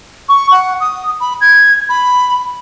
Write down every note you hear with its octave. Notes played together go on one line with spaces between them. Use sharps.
C#6
F#5
D#6
B5
G#6
B5